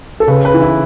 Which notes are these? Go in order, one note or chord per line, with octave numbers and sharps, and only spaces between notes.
A4
C#3 B4
B4
E3
E4